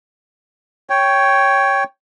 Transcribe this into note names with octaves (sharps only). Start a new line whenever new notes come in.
C#5 G5